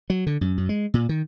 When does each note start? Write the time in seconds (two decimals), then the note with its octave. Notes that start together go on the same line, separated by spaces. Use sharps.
0.10 F#3
0.27 D3
0.41 F#2
0.58 F#2
0.69 G#3
0.94 A#2
1.09 D#3